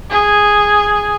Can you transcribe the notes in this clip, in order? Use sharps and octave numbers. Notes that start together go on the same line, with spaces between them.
G#4